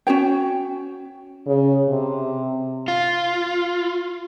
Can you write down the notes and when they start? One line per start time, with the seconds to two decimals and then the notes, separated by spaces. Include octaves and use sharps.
0.07 C#4 F#4 C#5 G5
1.46 C#3
1.90 C3
2.88 F4